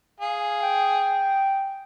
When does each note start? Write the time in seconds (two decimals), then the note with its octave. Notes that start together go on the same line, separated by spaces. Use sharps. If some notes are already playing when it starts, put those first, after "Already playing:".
0.20 G#4 F5
0.63 G5